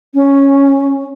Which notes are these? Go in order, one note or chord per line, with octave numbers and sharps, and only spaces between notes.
C#4